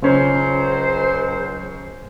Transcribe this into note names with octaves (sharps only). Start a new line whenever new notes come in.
C#2 C#3 F#3 C#4 C5